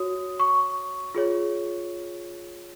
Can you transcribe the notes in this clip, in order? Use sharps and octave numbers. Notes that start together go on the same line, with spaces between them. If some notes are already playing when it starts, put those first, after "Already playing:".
Already playing: F#4 C#5 D#6
C#6
F4 G#4 C#5